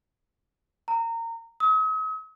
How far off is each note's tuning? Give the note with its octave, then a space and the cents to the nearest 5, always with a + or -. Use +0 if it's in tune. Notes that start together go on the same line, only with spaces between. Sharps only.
A#5 -25
D#6 +45